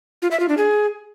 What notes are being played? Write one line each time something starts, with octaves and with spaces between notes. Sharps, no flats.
F4
E5
F4
D4
G#4